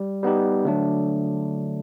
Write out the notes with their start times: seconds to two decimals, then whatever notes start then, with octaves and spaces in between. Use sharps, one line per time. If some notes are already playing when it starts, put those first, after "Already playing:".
Already playing: G3
0.23 G3 B3 D#4 G4
0.65 D3 F#3 A3 D4